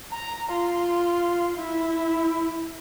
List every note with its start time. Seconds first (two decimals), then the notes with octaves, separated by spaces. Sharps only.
0.13 A#5
0.53 F4
1.57 E4